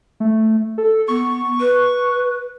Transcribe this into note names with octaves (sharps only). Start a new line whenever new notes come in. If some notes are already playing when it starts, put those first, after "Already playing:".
A3
A4
B3 C#6
B4